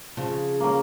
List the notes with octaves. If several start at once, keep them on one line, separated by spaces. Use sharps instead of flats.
C#3 F3
A#3 C#4